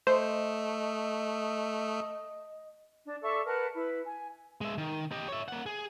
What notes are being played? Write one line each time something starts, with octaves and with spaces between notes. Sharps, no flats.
A3 C5 D#5
D4
A4 D5 E5 C#6
A#4 B4 F#5 A5
E4 B4
G#5
G#3 E5
D#3
G4 D#5
C#5 E5
A#3 F#5
G#4